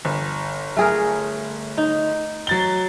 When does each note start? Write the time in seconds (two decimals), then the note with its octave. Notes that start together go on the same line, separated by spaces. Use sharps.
0.05 G1
0.77 A3 G#4 A#4
1.78 D#4
2.47 F#3 A6 G7